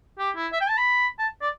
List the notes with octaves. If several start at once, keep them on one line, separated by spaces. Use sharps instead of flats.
G4
E4
E5
G5
A5
B5
A5
D5